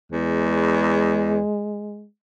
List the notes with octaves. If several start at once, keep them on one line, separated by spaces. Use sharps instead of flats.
E2 G#3